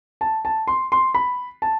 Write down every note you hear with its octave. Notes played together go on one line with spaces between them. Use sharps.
A5
A5
C6
C6
B5
A5